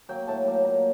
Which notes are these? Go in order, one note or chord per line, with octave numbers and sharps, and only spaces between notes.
F#3 A#3 G5
A2 A5
F#3 A#3
A#2 A#5